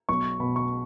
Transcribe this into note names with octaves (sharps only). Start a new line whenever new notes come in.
B1 C#6
B2 B5
C#6